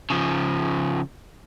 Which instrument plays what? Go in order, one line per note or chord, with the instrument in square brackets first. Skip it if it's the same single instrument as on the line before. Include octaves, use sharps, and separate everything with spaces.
[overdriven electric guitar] C#3 F3